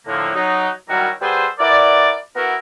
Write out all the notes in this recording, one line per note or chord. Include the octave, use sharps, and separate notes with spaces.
A2 D3 F3 A#3
F#3 D#4
D#3 F#3 G3 E4 F#4 A#4
G3 F#4 G#4 A4 B4 C5
E4 F#4 A#4 B4 D5
B3 E4 F#4 A#4